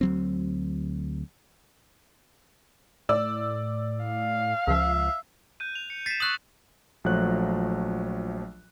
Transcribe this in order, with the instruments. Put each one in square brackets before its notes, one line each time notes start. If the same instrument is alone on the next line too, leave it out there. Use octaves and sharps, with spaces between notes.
[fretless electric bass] D2 F#3 C4
[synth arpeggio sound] A2 [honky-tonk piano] D5 E6
[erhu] F5
[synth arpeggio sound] C#2 F3 [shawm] E5
[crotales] F#6 G6 D#7
F7
C#7
[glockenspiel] A6 B6 [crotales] C7 E7
[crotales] C#6 E6 F#7 [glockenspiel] D#6 F#6
[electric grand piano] A#1 F3 F#3 A3 F#6